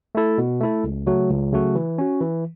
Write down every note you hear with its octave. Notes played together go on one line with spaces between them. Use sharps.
A3 E4 A4
B2
A3 E4 A4
C#2
C#3 F#3 A3 F#4
C#2
C#3 F#3 A3 F#4
E3
C#4 F#4
E3